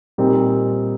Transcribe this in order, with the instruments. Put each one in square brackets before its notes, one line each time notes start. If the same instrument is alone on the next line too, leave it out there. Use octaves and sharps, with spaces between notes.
[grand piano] A#2 G3 C4 D#4